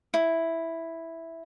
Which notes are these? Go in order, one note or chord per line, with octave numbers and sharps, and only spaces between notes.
E4